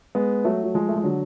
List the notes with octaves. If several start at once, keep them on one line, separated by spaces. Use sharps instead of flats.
G#3 B3
F#3 A3
F#3
F3 G#3
A3
G#3
D3 F#3